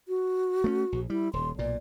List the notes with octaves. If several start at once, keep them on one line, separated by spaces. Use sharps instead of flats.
F#4
A3 B3 C#4
A#1
G3 E4
D#1 C6
B1 A#2 D5